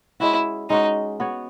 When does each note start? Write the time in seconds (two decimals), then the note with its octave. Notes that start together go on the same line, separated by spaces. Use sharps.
0.20 G#3 C#4 E4 F#4
0.69 G#3 C#4 D#4 F#4
1.20 B3 F#4 C#5